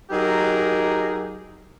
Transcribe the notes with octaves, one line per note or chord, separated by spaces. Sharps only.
F#3 D#4 G4 G#4 A#4